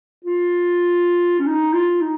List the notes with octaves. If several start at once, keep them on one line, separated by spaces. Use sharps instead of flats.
F4
C#4
D#4
F4
D#4